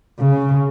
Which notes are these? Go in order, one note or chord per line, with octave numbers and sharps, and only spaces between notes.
C#3